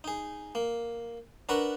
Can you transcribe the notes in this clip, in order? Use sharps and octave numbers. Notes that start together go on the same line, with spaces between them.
D#4 G#4
A#3
D4 A#4 B4 F#5 A#5 C#6